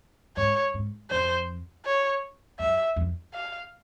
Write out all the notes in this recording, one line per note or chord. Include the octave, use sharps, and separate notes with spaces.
G#2 C#5
G#2
F2 C5
C#5
F#2 E5
F2
F5